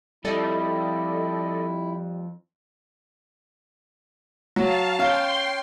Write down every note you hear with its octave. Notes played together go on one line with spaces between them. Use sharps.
F2 G3 E4 A4 D5 D#5
F#3 F5 A5
C#4 F5 G5 C6